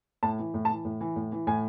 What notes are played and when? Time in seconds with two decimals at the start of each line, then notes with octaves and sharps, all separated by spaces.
0.23 A2 A5
0.39 E3
0.54 A2
0.65 A5
0.70 E3
0.85 A2
1.01 E3
1.16 A2
1.32 E3
1.47 A2 G#5